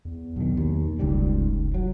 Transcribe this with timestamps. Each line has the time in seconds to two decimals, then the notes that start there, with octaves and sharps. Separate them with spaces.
0.05 E2
0.36 B1 D#3
0.57 D#2
0.99 F1 C#2 G#2 G3
1.74 F#3